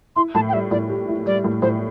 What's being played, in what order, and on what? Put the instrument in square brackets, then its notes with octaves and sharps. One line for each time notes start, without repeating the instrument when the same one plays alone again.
[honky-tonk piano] E4 [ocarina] C6
[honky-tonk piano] A2 [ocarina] A5
[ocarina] G5
[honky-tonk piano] G3 [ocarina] E5
[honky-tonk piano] A2 [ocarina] D5
[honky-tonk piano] G4
E4
[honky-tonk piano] G3 [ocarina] D5
[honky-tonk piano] A2
[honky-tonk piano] A2 [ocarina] C5